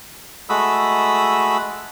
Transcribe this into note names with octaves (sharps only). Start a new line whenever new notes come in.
G#3 A3 F#4 B5 D#6 E6